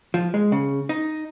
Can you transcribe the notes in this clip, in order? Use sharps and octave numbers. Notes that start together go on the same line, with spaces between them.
F3
G#3
C#3
D#4